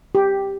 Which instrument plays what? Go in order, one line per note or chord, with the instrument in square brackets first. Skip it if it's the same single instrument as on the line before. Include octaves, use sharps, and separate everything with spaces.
[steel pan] G4